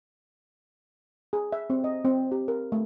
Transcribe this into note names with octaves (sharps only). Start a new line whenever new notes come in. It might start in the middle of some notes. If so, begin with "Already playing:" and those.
G#4
E5
C4
D#5
C4
G4
A#4
A3